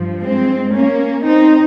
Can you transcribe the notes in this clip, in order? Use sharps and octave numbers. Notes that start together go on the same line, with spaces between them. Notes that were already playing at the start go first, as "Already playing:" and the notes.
Already playing: G2 F3
G#3 C4
A#3 C#4
C4 D#4